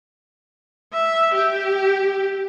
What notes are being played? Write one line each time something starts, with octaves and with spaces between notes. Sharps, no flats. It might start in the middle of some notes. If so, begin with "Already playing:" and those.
E5
G4